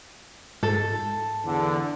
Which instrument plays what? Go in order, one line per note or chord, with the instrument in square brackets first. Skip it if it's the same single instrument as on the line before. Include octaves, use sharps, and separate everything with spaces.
[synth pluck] G#2 [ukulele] A4
[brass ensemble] E2 D3